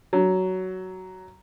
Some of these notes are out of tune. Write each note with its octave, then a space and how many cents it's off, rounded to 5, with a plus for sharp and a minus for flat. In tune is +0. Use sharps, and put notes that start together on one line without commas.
F#3 +10